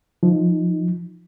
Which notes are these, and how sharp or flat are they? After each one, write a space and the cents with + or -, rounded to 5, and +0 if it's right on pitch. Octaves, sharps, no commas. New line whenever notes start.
F3 +0 D#4 +0